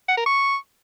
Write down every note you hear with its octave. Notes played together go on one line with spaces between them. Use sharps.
F#5
A#4
C#6